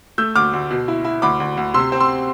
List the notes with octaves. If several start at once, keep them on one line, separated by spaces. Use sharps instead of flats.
A3 E6 G6
D2 D6 F6
D2
B2
E4
E4
D2 B5 D6
D2
D2
C3 C6 E6
C4
C6 E6